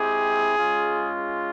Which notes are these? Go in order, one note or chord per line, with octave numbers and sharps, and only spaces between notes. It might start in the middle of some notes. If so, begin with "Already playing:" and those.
Already playing: G#3 C4 E4 G4 G#4
G#3 C#4 F4